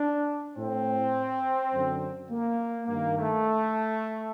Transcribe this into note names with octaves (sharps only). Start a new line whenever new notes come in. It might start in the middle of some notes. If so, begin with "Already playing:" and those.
Already playing: D4
A2 C4
F#2 D3
A#3
G2 D#3 A#3
A3